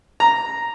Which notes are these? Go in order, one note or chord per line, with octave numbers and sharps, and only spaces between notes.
A#5